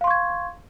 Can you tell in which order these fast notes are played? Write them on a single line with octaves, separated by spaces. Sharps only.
F5 C6 C#6 G#6